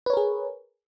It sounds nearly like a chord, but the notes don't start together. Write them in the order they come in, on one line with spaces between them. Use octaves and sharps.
B4 C#5 A#4 G#4